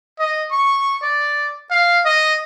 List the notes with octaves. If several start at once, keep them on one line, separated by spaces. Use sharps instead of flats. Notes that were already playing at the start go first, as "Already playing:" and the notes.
D#5
C#6
D5
F5
D#5